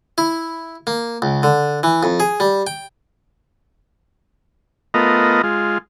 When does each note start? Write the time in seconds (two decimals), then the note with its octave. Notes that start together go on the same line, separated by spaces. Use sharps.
0.18 E4
0.87 A#3
1.22 C#2
1.43 D3
1.83 E3
2.03 F2
2.20 G#4
2.40 G3
2.67 G5
4.94 A3 B3 F4 A#4 D#5
5.43 G#3 F4